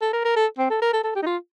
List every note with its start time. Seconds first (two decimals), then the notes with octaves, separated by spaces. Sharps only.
0.02 A4
0.13 A#4
0.25 A#4
0.36 A4
0.58 C4
0.70 A4
0.82 A#4
0.93 A4
1.04 A4
1.15 G4
1.22 D#4
1.26 F4